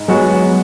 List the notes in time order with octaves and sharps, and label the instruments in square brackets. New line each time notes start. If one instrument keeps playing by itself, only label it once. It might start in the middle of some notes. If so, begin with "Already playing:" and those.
Already playing: [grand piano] G#2
[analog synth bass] F#3 [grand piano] G#3 B3 F#4